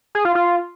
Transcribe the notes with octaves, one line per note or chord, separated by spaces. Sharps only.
G#4
F4
F4